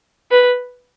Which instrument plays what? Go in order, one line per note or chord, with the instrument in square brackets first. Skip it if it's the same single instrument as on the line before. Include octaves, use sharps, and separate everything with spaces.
[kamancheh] B4